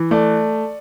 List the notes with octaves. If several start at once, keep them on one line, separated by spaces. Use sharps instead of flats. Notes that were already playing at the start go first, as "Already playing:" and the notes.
Already playing: E3
A3 D5